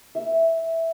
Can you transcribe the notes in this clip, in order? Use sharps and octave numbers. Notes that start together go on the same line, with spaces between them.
E5